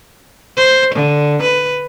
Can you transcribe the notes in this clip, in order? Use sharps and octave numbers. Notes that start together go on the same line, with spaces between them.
C5
D3
B4